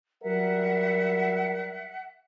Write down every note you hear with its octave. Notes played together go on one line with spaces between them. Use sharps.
F#3 G3 A#4 E5 F#5